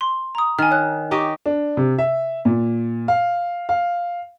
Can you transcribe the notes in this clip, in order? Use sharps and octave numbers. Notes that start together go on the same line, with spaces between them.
C6
A#5 D#6
D#3 G#5 F6
C#5 F#6
D#4 G4 D#5 C#6 D6
D4
C3
E5
A#2
F5
F5